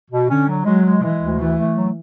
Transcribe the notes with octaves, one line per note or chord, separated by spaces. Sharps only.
B2
D3 C#4
F#3
F#3 G#3
G#3
E3 G#3
D2
E3 A3
A3
F#3